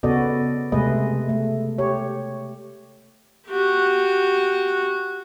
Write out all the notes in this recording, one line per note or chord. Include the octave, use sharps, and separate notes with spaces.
C#3 B3 F#4 A4 D5 D#5
C3 G#3 A3 G#4 B4 D#5
A3
G4 C#5
F#4 G4